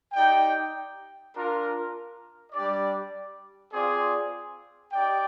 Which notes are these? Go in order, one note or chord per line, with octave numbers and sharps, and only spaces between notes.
D#4 G4 D5 G5
D4 F4 A#4
G3 D4 G4 D5
C4 F4 G#4 D5
D#4 G4 D5 G5